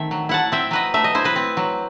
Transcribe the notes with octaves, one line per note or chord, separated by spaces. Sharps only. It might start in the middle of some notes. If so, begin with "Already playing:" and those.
Already playing: D#3 A3 C4 E5
F#3
E4 F#5 A5
C4 E5 G5
F#3 B4 D#5
A3 E5
D#5
E4 C5
B4 D#5
C4
F#3